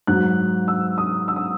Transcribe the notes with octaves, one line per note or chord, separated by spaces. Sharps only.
G#2 F#3 F#6
E6
D#6
E6
D#6